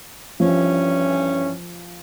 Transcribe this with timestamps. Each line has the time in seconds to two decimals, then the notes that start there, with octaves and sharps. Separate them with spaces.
0.40 G2 E3 F3 C#4